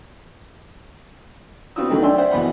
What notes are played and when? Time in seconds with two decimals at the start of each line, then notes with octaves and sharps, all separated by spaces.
1.76 B3 C4 F4 F#4 D#6 E6
1.89 D#3 F#3 A3 B3 C4 D#4
2.02 D5 E5 G5 G#5 C6 E6
2.18 C5 D5 E5 F#5 G5
2.31 B1 E3 B3 D#5 F#5 B5